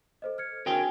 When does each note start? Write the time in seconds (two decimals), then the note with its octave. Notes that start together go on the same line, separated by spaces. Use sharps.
0.22 A4 C5 D#5
0.38 F6 G#6 C#7
0.66 C4 D4 E4 F#4 G#4 A#4 C#5 G5